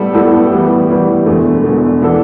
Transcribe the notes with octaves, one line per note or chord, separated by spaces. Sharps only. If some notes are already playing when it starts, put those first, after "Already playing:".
Already playing: A2 G3 B3 E4 A4
A2 G3 B3 E4 A4
A2 E3 G3 B3
A2 E3 G3 B3
E1 E2 D3 A3
E1 E2 D3 A3
E3 B3 D4 A4